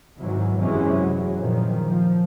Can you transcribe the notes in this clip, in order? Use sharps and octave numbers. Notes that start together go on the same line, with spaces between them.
G#2 C3 D#3 E3 F#3
F#2 C3 E3 F#3 G#3 C#4
F#3
A#2 D#3 F3
F3